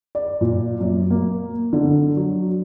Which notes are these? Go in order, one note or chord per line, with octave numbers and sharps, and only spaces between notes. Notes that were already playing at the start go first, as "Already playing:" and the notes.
D5
A#2
F#2
A#3
D3
F#3